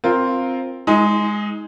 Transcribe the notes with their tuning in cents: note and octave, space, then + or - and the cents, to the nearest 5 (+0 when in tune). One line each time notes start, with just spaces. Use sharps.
C4 +5 F4 +0 A#4 +0
G#3 +0 D#4 +30